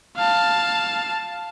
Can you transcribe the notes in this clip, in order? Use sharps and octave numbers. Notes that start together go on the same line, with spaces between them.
F5 A5